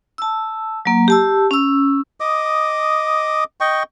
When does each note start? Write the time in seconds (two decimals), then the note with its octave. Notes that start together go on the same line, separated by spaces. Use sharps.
0.18 A5 E6
0.85 F#3 A#3
1.08 G4 A5 E6
1.51 C#4 E6
2.20 D#5 D6 D#6
3.60 D#5 G5 C#6